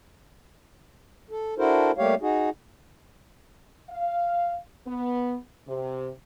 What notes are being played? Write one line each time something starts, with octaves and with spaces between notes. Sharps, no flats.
A4
D4 E4 F#4 A4 A#4 C5
G3 A3 A#3 G4 C#5 F5
D#4 F#4 G#4
F5
B3
C3